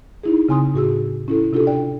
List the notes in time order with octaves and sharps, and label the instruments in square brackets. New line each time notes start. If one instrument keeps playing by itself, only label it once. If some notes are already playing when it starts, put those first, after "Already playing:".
[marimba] D#4 E4 G#4
C#3 C4 G#5 C6 D#6
A2 F#4 G#4 E6
C#4 E4 A4
C3 D4 F4 G4 A4
D5 G5